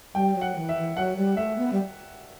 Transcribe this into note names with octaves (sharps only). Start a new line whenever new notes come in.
G3 G5
F#3
F#5
E3
E5
E3
F#3 F#5
G3
A3 E5
B3
G3